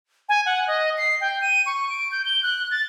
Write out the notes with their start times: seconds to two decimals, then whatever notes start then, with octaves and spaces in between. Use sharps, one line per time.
0.29 G#5
0.46 F#5
0.67 D#5
0.98 C7
1.21 G5
1.42 D#7
1.66 C#6
1.90 D7
2.12 G6
2.25 G7
2.43 F#6
2.71 A6